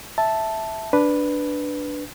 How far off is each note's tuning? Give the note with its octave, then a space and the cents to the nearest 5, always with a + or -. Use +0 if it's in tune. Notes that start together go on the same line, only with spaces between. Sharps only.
E5 +0 A5 +0
D4 +0 B4 +0